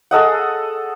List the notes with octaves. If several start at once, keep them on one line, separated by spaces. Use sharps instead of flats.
G#4 A4 D#5 F#5